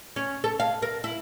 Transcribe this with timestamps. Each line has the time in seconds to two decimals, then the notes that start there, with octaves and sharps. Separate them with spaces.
0.16 C#4
0.44 A4
0.60 F5
0.82 A#4
1.04 E4